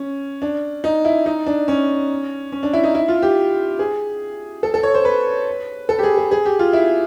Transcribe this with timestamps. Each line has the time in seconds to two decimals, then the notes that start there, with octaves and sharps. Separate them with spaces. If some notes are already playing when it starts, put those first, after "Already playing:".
Already playing: C#4
0.42 D4
0.84 D#4
1.05 E4
1.26 D#4
1.46 D4
1.68 C#4
2.52 C#4
2.63 D4
2.73 E4
2.84 D#4
2.95 E4
3.08 F4
3.22 G4
3.79 G#4
4.63 A4
4.74 A4
4.83 C#5
4.94 C5
5.05 B4
5.89 A4
5.99 G4
6.03 G#4
6.17 G#4
6.31 G#4
6.45 G4
6.59 F4
6.73 E4